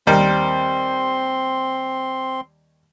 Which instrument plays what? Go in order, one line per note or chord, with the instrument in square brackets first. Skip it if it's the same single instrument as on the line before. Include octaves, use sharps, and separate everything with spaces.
[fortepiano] D#2 G3 A#4 [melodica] C4 C6